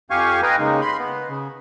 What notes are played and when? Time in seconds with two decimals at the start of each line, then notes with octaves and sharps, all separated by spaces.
0.10 F2 G4 F5 G#5 C#6
0.43 B4 D#5 F5 G5 G#5 A#5
0.59 C#3 G#3 A#3 D#4
0.81 B5 C6
0.99 B3
1.29 C#3